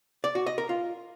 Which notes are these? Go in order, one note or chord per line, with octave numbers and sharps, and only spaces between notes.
D5
F#4
D#5
A#4
F4